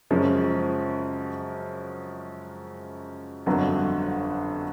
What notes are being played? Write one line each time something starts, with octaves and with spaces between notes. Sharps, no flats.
F#2 C#3 F3 G#3 C#4
G1 F2 D3 F#3